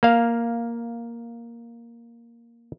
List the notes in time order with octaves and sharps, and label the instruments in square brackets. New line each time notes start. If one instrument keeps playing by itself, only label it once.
[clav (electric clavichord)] A#3 F5